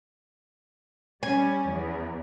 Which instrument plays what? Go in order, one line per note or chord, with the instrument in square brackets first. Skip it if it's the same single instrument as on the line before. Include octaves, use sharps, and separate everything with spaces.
[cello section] G3 C#4 [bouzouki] G#5
[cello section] E2